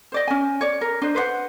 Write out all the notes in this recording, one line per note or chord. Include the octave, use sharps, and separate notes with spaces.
C5 D5 D#5
C#4 G#5
C#5 D5
A#4
D4 C5 D#5
B4 C5 D5 F#5